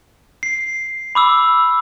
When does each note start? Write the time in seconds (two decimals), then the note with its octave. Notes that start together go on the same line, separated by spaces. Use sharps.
0.43 C7
1.15 B5 D6 E6